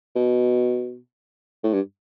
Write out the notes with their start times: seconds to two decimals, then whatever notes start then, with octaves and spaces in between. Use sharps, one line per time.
0.16 B2
1.64 A2
1.73 G2